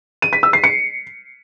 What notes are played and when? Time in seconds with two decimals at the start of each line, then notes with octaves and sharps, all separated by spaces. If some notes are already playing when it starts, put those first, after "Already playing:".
0.22 D#7
0.33 B6
0.43 E6
0.53 C7
0.64 C#7